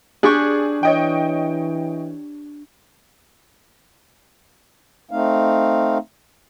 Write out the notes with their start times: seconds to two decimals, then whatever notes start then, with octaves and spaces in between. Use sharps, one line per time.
0.23 D4 G4 G#4 C#6
0.83 E3 C#5 D#5 G5
5.11 A3 C4 D#4 F5